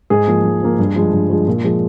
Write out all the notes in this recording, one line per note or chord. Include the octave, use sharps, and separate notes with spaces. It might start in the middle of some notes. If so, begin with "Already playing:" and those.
G#2 G#4
F3 A#3
G#2
F3 A#3
G2
F3 G#3
G2
F3 G#3
A#2
F3 G#3